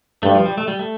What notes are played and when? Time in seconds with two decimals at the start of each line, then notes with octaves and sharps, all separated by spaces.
0.23 G2 A3
0.35 F3
0.46 G3
0.58 A3
0.68 G3
0.79 A3